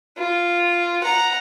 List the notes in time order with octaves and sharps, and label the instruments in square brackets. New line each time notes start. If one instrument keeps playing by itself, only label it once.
[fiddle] F4
F#5 A#5